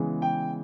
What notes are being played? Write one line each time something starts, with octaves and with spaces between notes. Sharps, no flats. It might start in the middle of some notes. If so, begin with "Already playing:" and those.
Already playing: C#3 E3 G#3 B3
G5